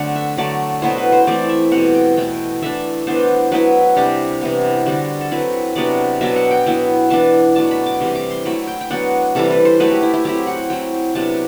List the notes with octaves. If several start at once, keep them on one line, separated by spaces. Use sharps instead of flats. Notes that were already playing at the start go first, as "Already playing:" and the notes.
Already playing: D3 F#3 A3 C4 D4 F#5
E5
D3 F#3 A3 D5
B2 F#3 B3 E4 C5
B4
C5
E3 A3 C4 D5
E5
B2 G3 C4 F#5
G5
B2 A3 E4 G5
E3 A3 D4 E5
E3 B3 D4 C5
F#3 B3 E4 B4
C3 G3 D4 G4
C3 E3 B3
D3 G3 D4 F#4
A4
F#3 C4 E4 B4
C3 F#3 B3 D4 D5
B2 F#3 B3 D4 E5
F#5
G5
F#3 B3 E4
E3 B3 D4 A5
B2 F#3 A3 D4 A5
B5
D6
C3 E3 G3 C4 C6
D6
C6
F#3 A3 E4 B5
G5
G5
F#3 B3 D4 F#5
C3 E3 G3 A4
B4
C5
F#3 A3 E4 B4
G4
E4
E4
F#3 C4 E4 G4
F#5
F#3 C4 E4 G5
C3 F#3 B3 D4 A5